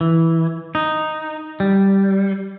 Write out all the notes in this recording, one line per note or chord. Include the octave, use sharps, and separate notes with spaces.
E3
D#4
G3